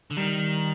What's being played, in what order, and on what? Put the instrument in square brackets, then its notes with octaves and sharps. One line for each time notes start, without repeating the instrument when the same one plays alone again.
[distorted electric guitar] D3
[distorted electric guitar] D#3 [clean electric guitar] G3